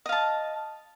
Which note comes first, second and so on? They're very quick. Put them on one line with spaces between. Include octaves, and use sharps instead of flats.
D#5 F5 A5